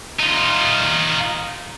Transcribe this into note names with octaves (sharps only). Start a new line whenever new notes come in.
D#4 F4